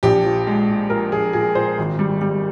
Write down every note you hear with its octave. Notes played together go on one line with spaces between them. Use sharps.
A#1 G4
F3
G#3
A#2
A#2 A#4
A#1 G#4
A#2 G#4
A#2 C5
G#1
G3
G3